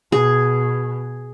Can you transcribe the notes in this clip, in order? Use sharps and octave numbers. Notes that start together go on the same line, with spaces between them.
B2 G#4